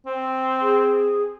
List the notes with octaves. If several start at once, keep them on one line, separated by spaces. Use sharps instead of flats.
C4
G#4